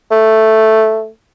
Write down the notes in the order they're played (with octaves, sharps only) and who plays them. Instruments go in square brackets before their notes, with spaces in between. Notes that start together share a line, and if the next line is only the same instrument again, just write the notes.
[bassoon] A3